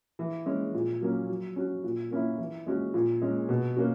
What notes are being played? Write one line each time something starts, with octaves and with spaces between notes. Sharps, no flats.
E3
G#3 C#4
A#2
F#3 A#3 C#4
F#3
C#4 F#4
A#2
A#3 C#4 E4
E3
G#3 C#4 F#4
A#2
G#3 C#4
B2
A#3 C#4 F#4